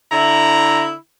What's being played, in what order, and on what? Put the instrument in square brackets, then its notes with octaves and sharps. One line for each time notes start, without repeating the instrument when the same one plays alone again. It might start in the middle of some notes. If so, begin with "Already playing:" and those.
[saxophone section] D3 E4 [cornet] A#5